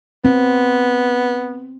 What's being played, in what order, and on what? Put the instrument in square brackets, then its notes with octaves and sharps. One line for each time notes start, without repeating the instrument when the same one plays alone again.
[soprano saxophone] B3 [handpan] C4